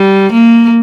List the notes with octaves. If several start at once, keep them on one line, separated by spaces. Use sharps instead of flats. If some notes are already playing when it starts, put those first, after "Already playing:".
Already playing: G3
A#3